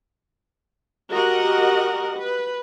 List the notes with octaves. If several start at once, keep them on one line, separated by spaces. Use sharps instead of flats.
F#4 G4 A#4 D#5 F#5
B4